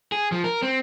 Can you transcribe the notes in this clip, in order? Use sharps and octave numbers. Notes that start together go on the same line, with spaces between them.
G#4
F3
A#4
C4